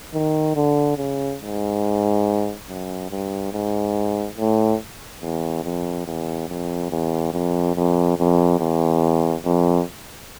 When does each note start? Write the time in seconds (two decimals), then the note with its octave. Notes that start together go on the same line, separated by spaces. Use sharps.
0.14 D#3
0.56 D3
0.98 C#3
1.41 G#2
2.68 F#2
3.10 G2
3.53 G#2
4.37 A2
5.21 E2
5.64 F2
6.06 E2
6.48 F2
6.91 E2
7.33 F2
7.75 F2
8.18 F2
8.59 E2
9.44 F2